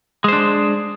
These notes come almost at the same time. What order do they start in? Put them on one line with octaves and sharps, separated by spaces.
G#3 C5 D4